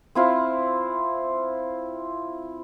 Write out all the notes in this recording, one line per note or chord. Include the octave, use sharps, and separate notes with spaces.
C4 E4 F4